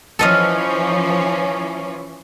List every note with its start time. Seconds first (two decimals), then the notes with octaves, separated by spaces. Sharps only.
0.19 E3 F3 C#4 A4 D#5 F5